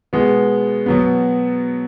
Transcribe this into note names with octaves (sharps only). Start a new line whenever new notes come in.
B2 G#3 B3
B2 F#3 B3